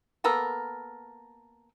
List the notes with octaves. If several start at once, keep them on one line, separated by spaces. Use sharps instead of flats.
A#3 B3 A4 A#4